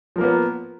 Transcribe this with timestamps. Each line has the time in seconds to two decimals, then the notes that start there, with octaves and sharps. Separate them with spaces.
0.16 F3
0.18 A#4
0.21 A#3
0.23 B3